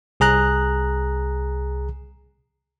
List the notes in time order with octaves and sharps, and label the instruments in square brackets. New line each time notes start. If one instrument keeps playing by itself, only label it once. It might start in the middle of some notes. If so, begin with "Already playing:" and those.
[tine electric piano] C2 G#4 A#5 F#6